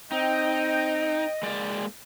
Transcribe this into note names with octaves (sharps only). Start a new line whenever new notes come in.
C4 D#4 D#5 G5
G#3 A#3 D5